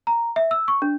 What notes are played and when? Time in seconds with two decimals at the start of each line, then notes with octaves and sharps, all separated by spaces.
0.07 A#5
0.36 E5
0.51 E6
0.68 C#6
0.82 D4